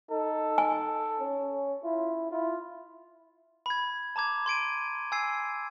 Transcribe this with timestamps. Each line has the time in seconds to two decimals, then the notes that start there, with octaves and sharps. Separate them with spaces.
0.11 D#4 A4
0.58 G#5
1.20 C#4
1.84 E4 F4
2.31 E4 F4
3.66 B5 G#6
4.16 A5 A#5 D6 G#6
4.46 C6 G#6 D7 D#7
5.12 G#5 E6 G#6 C7